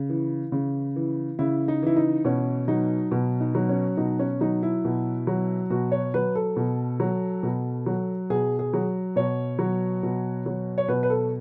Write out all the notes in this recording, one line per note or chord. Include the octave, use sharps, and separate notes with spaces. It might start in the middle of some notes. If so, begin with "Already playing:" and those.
Already playing: C#3
E3
C#3
E3
C#3 E4
D#4
E3 E4
D#4
B2 C#4
F#3 D#4
B2
D#4
F#3
C#4
B2 D#4
C#4
F#3 D#4
E4
B2
F#3
B2 F#4
C#5
F#3 B4
A4
B2
F#3
B2
F#3
B2 G#4
G#4
F#3
B2 C#5
F#3
B2
F#3
C#5
B2 B4
B4
A4